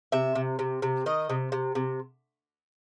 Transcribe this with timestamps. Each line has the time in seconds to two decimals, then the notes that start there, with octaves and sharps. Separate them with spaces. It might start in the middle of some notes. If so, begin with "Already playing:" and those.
0.12 C3 E5
0.35 C3
0.59 C3
0.82 C3
1.06 D#3 D#5
1.30 C3
1.52 C3
1.75 C3